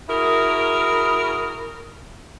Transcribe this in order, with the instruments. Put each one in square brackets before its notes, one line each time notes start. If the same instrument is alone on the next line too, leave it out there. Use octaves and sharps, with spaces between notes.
[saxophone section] E4 F#4 G#4 A#4